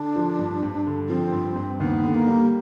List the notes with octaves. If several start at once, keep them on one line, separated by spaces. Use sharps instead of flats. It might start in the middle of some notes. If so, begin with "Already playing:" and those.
Already playing: D3 D4
F3
G2
G2
D3
F3 C4
G2
G2
D#2 B3
D3
A#3
G3